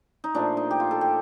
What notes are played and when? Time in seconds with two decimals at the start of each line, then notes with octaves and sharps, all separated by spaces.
0.24 D#4
0.35 A#2 F3 A3 D4
0.57 D#4
0.71 G4
0.80 F4
0.91 A4
1.01 G4